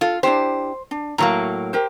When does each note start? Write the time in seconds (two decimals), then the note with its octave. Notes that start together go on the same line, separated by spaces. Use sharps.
0.01 F4 A4 F5
0.23 D4 E4 G4 C5
0.91 D4
1.18 A2 F#3 A#3 A#5
1.73 G4 A#4 C5